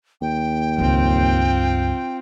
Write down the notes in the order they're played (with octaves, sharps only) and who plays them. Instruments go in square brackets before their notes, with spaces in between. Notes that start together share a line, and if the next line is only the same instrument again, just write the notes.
[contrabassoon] D#2 [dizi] G5
[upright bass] C#2 G2 [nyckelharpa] C4 F4